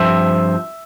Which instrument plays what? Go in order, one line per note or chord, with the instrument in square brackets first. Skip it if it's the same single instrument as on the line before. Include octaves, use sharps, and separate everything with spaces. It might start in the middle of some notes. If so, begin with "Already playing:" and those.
Already playing: [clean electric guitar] G2 F3 C4 E5